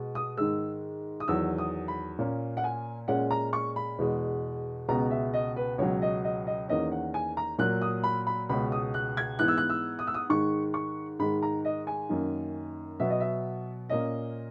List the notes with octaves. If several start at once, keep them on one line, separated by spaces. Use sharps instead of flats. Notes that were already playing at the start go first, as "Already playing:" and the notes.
Already playing: B2 G#3
D#6
G#2 D#3 G#3 E6
D#6
E2 D#3 F#3 E6
D#6
B5
A#2 A#3 C#4
F#5
G#5
A#2 G#3 C#4 F#5
A#5
C#6
B5
E2 B2 G#3
C#2 B2 G#3 B3 A#5
E5
D#5
B4
C#2 B2 F#3 C#5
D#5
D#5
D#5
E2 D#3 A#3 C#4 D#5
F#5
G#5
A#5
A#2 F#3 A#3 F#6
D#6
B5
B5
C#2 B2 G#3 C#4 B5
D#6
F#6
G#6
G#2 E3 B3 F#6
E6
F#6
E6
D#6
E6
D#6
G#2 D#3 G#3 C#6
C#6
G#2 D#3 G#3 B5
A#5
D#5
G#5
F#2 D#3 A#3
B2 F#3 B3 E5
D#5
E5
A#2 A#3 C#4 D#5